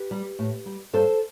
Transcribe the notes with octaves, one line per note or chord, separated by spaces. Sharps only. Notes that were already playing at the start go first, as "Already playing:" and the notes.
Already playing: G4 B4
G3
A2
G3
G2 A4 C5